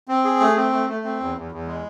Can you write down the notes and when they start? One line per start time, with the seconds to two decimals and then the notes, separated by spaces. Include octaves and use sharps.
0.08 C4
0.24 G#4
0.40 A3
0.56 C4
0.72 A3
0.88 A3
1.04 C4
1.20 E2
1.35 E2
1.52 E2
1.67 G#3